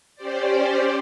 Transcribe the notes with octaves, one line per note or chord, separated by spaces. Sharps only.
C#4 G4 C5 D5